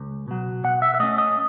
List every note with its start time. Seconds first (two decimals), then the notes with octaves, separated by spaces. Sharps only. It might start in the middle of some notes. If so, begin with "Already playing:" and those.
Already playing: C#2
0.28 B2 F#3
0.64 B2 F#5
0.82 E5
0.95 E5
1.00 A3 C#4 D#5
1.18 D#5